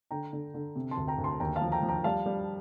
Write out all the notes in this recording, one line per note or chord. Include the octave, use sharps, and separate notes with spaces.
D3 G5 A#5
D3
D3
C3
A5 C6
D2
G5 A#5
D2
A5 C6
D#2 G5 A#5
F5 A5
F3
G5 A#5
F3
G5 A#5
G3 F5 A5
G3